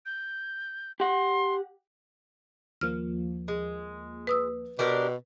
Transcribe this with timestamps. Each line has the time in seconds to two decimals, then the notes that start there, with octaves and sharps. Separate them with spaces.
0.06 G6
1.00 G4 F#5 C6
2.81 D#2 F3 A#3 F6
3.48 G#3
4.27 B4 D#6 E6
4.79 B2 D4 G4 A#4